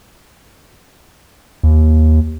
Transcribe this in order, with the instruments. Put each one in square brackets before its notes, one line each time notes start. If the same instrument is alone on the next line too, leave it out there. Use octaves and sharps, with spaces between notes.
[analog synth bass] D#2